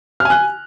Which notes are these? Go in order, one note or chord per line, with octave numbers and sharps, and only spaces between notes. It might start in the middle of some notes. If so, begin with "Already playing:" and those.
G#5 F6 F#6